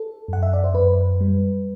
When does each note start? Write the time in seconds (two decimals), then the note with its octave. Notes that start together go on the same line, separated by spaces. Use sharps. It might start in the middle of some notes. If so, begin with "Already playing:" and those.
Already playing: A4
0.28 F#2 F#5
0.43 E5
0.53 D5
0.64 C5
0.74 F#2 B4
1.21 G3